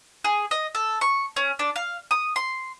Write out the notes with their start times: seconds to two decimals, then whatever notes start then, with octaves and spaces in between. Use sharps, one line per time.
0.24 G#4
0.51 D#5
0.75 A4
1.01 C#6
1.36 C#4
1.59 D4
1.76 F5
2.11 D#6
2.36 C6